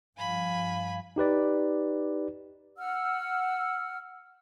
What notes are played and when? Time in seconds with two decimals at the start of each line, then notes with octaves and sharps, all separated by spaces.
0.17 G2 F3 F5 G#5 B5
1.16 D#4 G4 B4 D5
2.78 F#5 E6 F6